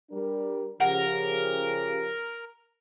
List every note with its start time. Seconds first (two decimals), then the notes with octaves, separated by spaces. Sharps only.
0.11 G3 D4 A#4
0.80 C#3 F3 G4 A#4 F#5